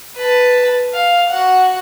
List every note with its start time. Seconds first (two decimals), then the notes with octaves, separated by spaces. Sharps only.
0.15 B4 A5
0.94 F5
1.29 F#4 F#5